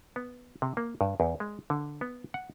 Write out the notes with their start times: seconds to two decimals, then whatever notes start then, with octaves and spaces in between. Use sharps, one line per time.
0.16 B3
0.62 C3
0.77 A#3
1.01 G2
1.20 E2
1.40 G#3
1.70 D3
2.01 B3
2.34 F#5